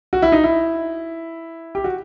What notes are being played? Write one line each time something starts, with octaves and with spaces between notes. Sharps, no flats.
F#4
E4
D#4
E4
G4
F#4